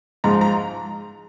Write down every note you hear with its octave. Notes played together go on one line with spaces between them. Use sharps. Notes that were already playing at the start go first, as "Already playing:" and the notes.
G#2 F3 G#3 A#5
A#5